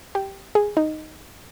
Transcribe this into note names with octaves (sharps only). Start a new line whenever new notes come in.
G4
G#4
D#4